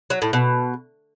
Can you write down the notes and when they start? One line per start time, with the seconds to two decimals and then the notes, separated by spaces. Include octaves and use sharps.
0.10 F#3
0.22 A2
0.33 B2